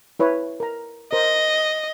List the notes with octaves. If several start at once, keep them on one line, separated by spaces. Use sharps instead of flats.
E4 B4 C#5
A#4 A#5
A#4 C5 D#5